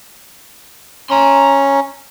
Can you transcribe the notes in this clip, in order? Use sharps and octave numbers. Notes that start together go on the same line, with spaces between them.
C#4 A#5 C6